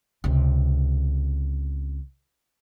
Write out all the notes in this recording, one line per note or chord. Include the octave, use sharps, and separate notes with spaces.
C#2 C3